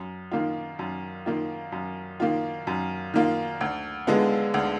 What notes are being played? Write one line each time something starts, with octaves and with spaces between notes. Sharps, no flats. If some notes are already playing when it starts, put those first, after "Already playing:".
Already playing: F#2
D#3 A#3 F4
F#2
D#3 A#3 F4
F#2
D#3 A#3 F4
F#2
D#3 A#3 F4
D2
D3 G#3 B3 F4
D2